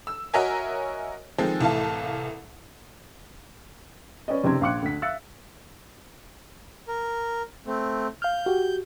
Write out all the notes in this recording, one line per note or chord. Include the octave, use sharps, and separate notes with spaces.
E6
F#4 A#4 C#5 D#5 E5 G#5
D#3 F3 G#3 C4 G#4 A4
C2 A2 E3 A3 F5 A5
C#4 B4 D5 D#5
F#1 C3 D#3 C4 D5 G#6
A#1 F5 C6 D6 F#6 C#7
D2 B6
E5 F5 E6 F#6 A6 C#7
A#4
A3 C4
F5 F6 G6
F#4 G4